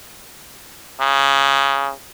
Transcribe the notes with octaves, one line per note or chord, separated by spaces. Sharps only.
C#3